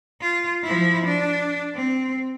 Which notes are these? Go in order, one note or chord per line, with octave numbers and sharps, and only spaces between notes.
F4
F3 E4
D4
C4